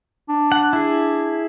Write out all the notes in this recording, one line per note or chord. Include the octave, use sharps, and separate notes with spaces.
D4
F#5
E4 G#4